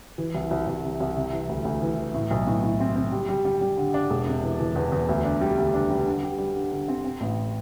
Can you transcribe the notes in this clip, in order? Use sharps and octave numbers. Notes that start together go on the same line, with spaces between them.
E3
C2
C2
C2
C3
C2
C3
E3
D2
D2
E3
E3
A2
B1
A2
A2
C4
C4
G3
G3
G3
G3
D3
D4
E1
C3
E3
E3
E2
E2
D2
D4
G3
D2
D4
G3
D3
G3
G3
D3
D3
C4
C4
A1